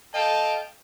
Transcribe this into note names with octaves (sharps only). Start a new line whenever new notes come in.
A4 D#5 F5 G5 A5